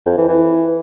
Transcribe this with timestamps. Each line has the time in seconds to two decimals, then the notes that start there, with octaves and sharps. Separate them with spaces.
0.06 F2
0.17 E3
0.28 E3